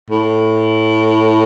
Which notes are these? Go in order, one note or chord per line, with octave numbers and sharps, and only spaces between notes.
A2